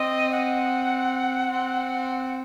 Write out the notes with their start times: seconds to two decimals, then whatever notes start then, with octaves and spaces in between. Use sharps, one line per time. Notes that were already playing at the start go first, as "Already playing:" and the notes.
Already playing: C4 D#5
0.32 F#5
1.51 C4